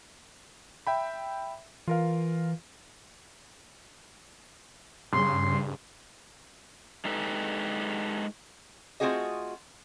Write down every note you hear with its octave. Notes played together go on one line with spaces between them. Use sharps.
E5 G5 B5
E3 F4 A#4 F5
G2 C#3 G3 C6
G#3 D4 D#4 G4 A4 B4
A3 C4 F4 F#4 G#4 D#5